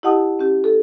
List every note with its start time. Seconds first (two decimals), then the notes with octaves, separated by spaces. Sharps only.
0.03 E4 G4 D#5 F#5 A5 D#6
0.39 C#4 G4
0.64 A4